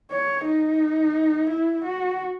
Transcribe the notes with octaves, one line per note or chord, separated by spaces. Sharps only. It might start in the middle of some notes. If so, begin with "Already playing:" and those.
C#5
D#4
E4
F#4